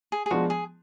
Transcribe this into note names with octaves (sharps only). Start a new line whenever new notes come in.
G#4
G#4
F3 G#3 B3 D4 F#4
G#4